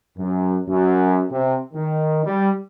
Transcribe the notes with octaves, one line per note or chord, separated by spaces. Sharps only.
F#2
F#2
C3
D#3
G3